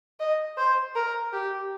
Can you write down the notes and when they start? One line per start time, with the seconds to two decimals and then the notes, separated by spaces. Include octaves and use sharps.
0.20 D#5
0.57 C5
0.96 A#4
1.33 G4